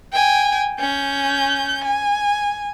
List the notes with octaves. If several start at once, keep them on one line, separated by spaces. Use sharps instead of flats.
G5 G#5
C#4 G6
G#5